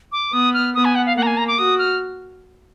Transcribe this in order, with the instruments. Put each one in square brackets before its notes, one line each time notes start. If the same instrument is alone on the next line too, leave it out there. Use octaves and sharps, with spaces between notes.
[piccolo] D6
[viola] B3 [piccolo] D#6
[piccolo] F6
[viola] B3 [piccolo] D#6
[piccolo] G#5
F#5
F5
[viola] A#3 [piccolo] F#5
[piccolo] A#5
G#5
A#5
D6
[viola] F#4 [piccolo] D#6
[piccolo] F6